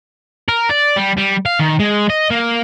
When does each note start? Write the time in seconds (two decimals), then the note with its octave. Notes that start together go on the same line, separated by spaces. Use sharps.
0.48 A#4
0.69 D5
0.97 G3
1.17 G3
1.46 F5
1.60 D#3
1.79 G#3
2.10 D#5
2.30 A#3